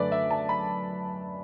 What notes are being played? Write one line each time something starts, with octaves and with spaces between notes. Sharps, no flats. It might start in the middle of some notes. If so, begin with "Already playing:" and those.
Already playing: F#2 D3 A3 B4 D5
E5
A5
B5